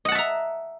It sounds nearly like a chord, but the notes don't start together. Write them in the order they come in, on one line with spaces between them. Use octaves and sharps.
D#5 F#5 A5 E5 A#5